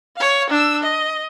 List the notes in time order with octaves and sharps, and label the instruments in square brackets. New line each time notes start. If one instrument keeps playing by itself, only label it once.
[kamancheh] C#5 F5
D4 E6
D#5